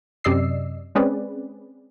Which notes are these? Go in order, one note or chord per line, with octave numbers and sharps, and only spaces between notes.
F#2 C3 D5 D#5 E6 C7
G#3 C4 C#4 G#4 B4 D5